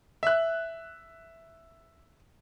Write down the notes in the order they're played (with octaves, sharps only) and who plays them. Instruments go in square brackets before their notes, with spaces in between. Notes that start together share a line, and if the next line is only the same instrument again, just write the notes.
[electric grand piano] E5 F#6